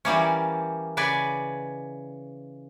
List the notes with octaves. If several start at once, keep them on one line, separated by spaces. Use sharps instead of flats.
E3 G3 A#3 C#4
C#3 B4 D5 G#5